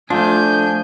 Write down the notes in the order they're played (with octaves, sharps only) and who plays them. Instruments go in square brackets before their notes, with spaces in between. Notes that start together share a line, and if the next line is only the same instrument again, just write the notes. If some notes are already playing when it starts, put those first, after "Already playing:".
[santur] F3 [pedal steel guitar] A3 D4 [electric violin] G#5 G6